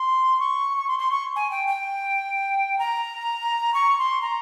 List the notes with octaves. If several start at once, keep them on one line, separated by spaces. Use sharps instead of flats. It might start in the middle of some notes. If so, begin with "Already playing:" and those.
Already playing: C6
C#6
C#6
C6
C6
C#6
G#5
G5
G5
A#5
C#6
C6
A#5